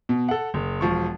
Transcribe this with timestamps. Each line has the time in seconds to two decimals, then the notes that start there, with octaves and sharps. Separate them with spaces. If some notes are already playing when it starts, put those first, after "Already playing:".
0.09 B2
0.29 A4 F#5
0.54 F#1
0.81 E1 F3 C#6